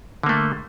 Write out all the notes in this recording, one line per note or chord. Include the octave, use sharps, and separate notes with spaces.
D3 A3 A#3